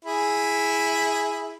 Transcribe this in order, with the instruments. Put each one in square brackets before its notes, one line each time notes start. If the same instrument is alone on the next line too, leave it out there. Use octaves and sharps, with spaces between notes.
[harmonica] E4 G#4